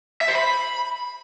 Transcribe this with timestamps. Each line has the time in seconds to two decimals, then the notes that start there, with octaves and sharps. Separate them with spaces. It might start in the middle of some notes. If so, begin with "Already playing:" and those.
0.21 E5
0.28 C5
0.35 B5